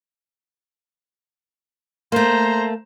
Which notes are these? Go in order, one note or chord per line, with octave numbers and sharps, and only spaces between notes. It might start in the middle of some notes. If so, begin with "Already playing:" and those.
A3 A#3 C5 A#5